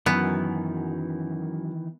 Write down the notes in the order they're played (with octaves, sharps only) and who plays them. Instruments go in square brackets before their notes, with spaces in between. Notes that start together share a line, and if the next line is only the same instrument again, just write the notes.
[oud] F#2 [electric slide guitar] D#3 E3 [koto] B3